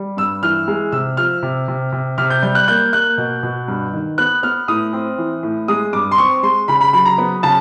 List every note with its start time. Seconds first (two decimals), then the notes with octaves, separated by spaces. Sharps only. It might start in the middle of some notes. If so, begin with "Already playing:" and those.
Already playing: G3
0.17 G2 E6
0.43 E3 F6
0.68 G#3
0.92 C3 E6
1.17 F3 F6
1.42 C3
1.68 C3
1.92 C3
2.18 C3 F6
2.30 G6
2.43 G3 G6
2.55 F#6
2.68 A#3 G6
2.93 A#3 F#6
3.18 B2
3.43 B2
3.68 G2
3.93 D#3
4.18 B3 F#6
4.43 B3 F6
4.68 A2 D#6
4.93 C4
5.18 E3
5.43 A2
5.68 G#3 D#6
5.93 G2 D6
6.11 C6
6.18 C4 C#6
6.43 G#3 C6
6.68 C#3 B5
6.81 B5
6.93 F#3 B5
7.05 A#5
7.18 B3
7.43 C#3 A5